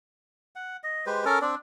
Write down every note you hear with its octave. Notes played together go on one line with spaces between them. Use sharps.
F#5
D#5
G#3 G4 B4 C5
C#4 A4 A#4
C4 D4 D5